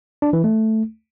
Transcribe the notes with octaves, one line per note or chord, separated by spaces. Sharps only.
D4
E3
A3